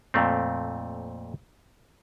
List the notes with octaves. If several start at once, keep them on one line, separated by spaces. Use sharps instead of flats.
F2 A#2 A3 C4